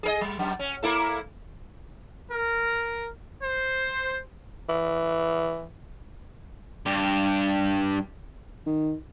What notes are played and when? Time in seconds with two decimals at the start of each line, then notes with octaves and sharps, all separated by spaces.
0.03 G#4 A#4 D#5
0.21 G3
0.39 F#2
0.59 C#4
0.83 A#3 E4 A4
2.30 A#4
3.42 C5
4.69 E3
6.87 G2 G4
8.66 D#3